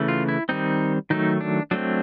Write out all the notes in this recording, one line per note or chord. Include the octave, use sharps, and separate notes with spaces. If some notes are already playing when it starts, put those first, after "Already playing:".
Already playing: C#3 E3 A3
F4
E4
D#3 G3 C4 D#4
D#3 F#3 A3 D#4
D4
F#3 A3 C4 D4